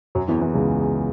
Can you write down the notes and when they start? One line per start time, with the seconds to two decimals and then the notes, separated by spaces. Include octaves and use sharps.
0.15 F#2 F#3
0.28 E2 E3
0.41 E2 E3
0.54 C#2 C#3